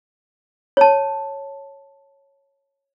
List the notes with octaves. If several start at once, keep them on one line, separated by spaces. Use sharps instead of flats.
C#5 A5